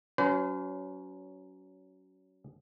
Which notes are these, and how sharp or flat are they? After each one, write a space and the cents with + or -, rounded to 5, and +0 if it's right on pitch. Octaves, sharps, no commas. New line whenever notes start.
F#3 +15 C#4 +25 C5 -45